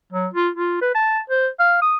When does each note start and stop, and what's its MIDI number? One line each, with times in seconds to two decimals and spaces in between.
0.13 0.27 54
0.34 0.49 65
0.55 0.77 65
0.81 0.94 71
0.95 1.19 81
1.30 1.48 72
1.60 1.81 77
1.82 1.97 87